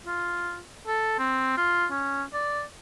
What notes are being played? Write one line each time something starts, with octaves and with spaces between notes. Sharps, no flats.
F4
A4
C4
F4
C#4
D5